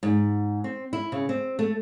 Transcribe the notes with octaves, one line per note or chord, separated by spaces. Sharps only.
G#2
C4
E4
C#3
C4
A3